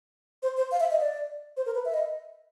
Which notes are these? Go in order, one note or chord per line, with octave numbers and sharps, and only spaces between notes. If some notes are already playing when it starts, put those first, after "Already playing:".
C5
C5
F5
E5
D#5
D5
C5
A#4
B4
E5
D#5